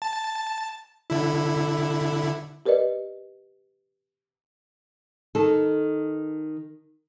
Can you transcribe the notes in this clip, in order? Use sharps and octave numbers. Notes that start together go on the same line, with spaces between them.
A5
D3 E4
G4 A#4 B4 D5 D#5
D#3 A4